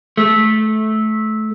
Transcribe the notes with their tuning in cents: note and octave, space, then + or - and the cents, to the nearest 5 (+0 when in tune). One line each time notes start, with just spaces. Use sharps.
A3 -20